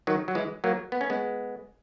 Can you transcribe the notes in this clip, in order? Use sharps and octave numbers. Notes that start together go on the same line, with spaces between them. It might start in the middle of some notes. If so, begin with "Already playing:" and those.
D#3 F#3
F#3
E3 G#3
F#3 A#3
B3
C#4
G#3 B3